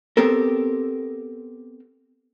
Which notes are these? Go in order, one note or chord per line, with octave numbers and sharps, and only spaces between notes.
B3 C4 G4 A4 A#4